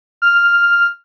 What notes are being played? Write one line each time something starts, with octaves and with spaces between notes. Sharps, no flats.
F6